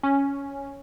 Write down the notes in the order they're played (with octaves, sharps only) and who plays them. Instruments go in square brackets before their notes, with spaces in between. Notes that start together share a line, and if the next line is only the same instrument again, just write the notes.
[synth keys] C#4